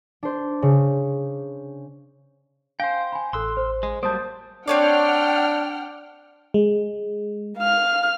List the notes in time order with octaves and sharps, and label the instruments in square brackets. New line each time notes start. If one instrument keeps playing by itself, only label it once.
[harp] D4 C5
C#3
[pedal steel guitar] C5 G5 [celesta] F5 G#5 G6
[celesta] G#5 B5
[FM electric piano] A1 [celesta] A4 F#6 [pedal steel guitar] C6 E6
[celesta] C5
[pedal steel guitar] G#3
[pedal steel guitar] F#3 G3 A#3 [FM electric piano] C5 A5 [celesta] D#6 G6
[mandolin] C4 C#5 D5 [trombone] D4 [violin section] F#5 G5 F6
[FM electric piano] G#3
[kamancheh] F5 F6